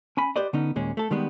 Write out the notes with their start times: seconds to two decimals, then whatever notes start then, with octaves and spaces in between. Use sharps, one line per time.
0.17 C#4 G#5 B5
0.36 G4 B4 C5 D5 D#5
0.53 D3 B3 C#4 D#4
0.76 D#2 A#2 G#3 C#4
0.97 A3 A4
1.11 D#3 G3 G#3 B3